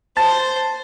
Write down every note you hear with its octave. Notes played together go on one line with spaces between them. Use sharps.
C5 A5